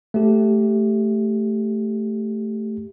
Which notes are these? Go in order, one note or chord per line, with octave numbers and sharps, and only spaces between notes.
A3 G4